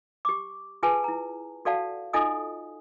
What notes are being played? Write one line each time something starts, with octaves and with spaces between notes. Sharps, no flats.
G4 D6
F4 G#4 B4 G#5 A5
E4 A#5
F#4 A4 D5 F5 F#5 A5
D#4 F4 A4 D#5 G#5 D#6